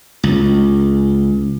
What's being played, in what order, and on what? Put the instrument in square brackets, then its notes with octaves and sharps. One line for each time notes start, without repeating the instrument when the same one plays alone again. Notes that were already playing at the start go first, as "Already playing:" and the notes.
[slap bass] C#2